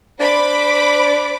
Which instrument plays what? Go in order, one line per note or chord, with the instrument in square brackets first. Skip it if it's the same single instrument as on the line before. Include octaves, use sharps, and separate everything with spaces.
[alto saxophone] D4 [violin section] C5 B5 D6